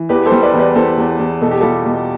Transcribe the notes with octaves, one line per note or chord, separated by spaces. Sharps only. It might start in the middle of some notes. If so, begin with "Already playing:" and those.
Already playing: E3
E2 G4 B4
A4 C5
G3
B4 D5
E2
B4 D5
E2 A4 C5
E2
E2
B2 A4
G4
G3 F4 A4
B2